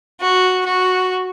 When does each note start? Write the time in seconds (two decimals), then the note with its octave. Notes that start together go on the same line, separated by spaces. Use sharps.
0.21 F#4
0.66 F#4